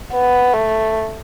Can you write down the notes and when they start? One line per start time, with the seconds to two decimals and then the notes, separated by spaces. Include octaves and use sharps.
0.13 B3
0.54 A3